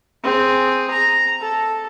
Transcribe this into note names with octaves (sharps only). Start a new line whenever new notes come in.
C4 G#4
A#5
A4